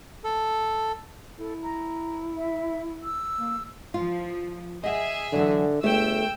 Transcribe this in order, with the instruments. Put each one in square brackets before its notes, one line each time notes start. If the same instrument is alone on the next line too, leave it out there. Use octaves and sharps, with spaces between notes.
[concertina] A4
[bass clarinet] E4 [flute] A4
[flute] A#5
E5
E6
[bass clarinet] A#3
[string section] F3 [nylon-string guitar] F4
[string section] G#4 E5 [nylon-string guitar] D#5 F#5
[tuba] D3 [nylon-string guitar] E3 F#3
[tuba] G1 [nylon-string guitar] A3 G#4 E5 [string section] G5 E6